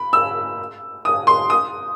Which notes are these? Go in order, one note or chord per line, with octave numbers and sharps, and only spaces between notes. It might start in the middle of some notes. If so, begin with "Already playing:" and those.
Already playing: B5
E6
D#6
C6
D#6